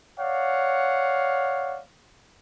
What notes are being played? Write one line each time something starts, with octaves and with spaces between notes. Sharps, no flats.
C#5 D5 F5 F#5